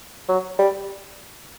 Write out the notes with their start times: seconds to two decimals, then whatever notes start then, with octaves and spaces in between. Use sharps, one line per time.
0.29 F#3
0.59 G3